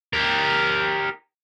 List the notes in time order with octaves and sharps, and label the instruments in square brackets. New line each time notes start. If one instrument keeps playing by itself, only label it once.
[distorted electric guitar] G4 A#4